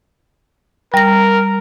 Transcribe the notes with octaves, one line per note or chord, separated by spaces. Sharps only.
G3 A#4 A#6